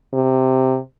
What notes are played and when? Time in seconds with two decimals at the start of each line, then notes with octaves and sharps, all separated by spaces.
0.14 C3